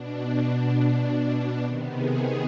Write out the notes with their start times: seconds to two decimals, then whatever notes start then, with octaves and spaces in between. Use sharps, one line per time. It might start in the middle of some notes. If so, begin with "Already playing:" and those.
Already playing: B2 D4
0.44 B2
1.04 B2
1.62 C3 D#3 B3
1.92 G#4